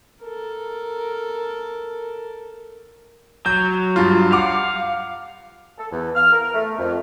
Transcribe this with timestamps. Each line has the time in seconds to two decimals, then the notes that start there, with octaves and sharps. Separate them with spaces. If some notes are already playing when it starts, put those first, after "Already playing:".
0.23 A4 A#4
3.46 F#3 G6
3.96 G2 F4
4.32 F5 F#5 D6 F6
5.78 A4
5.92 E2
6.15 F6
6.33 A#4
6.54 A3
6.79 F2